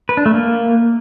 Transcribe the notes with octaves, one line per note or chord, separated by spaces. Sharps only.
B4
D4
A3
A#3